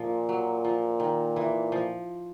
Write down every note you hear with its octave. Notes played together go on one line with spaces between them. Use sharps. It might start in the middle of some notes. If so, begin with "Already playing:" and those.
Already playing: A#2 F3
F#3
F3
D#3
E3
F3